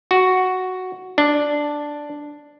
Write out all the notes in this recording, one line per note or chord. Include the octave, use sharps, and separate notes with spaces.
F#4
D4